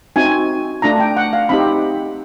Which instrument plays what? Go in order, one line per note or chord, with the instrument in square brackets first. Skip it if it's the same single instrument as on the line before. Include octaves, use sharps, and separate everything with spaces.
[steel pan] C4 D#4 F#4 G#5
A3 D4 F4 A#5
G5
F#5
F5
C4 D#4 G4 B5